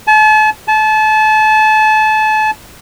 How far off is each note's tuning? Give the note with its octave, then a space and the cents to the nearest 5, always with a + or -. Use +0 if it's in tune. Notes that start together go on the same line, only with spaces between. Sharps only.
A5 -40
A5 -30